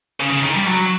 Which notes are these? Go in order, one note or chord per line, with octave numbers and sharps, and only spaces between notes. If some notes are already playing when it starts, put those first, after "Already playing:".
C#3
C#3
D#3
G3
F#3